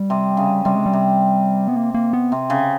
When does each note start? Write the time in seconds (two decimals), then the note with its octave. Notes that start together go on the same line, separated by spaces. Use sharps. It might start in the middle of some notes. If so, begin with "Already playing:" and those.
Already playing: G3
0.10 C3
0.37 C#3
0.65 C3 G3
0.76 G#3
0.86 G3
0.93 C3
1.68 B3
1.76 A#3
1.94 A#3
2.13 B3
2.32 C3
2.50 C#3